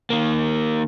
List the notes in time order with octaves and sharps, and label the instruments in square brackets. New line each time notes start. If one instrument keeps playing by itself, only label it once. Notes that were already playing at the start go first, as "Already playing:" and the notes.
[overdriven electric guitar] D#3 A#3